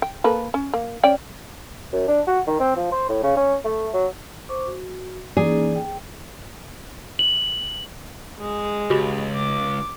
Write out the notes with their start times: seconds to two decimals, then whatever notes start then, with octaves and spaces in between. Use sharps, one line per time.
0.02 G5
0.24 A#3 A4 B4
0.54 C#4
0.74 A#3
1.03 C#4 D5 G5
1.93 F#2
2.08 D4
2.27 F#4
2.47 D#3
2.60 C4
2.76 F3
2.92 C5
3.09 A2
3.23 C#3
3.37 C#4
3.65 A3
3.94 F#3
4.49 C5 C#6 D6
4.67 F#4
5.37 E3 A#3 C#4 D#4 G#4 D5
5.75 G5
7.19 F#7
8.38 G#3 G#4
8.90 C#2 F#4 G4 B5
9.35 D6